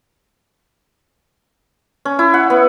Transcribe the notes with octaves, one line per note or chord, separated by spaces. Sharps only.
C#4
E4
F#5
B3